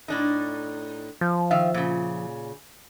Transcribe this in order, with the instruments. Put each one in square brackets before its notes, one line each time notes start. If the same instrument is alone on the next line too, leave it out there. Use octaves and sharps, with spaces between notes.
[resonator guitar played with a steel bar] A2 D4 D#4
[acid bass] F3
[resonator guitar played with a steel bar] D#3 E5 F5
A#2 C#3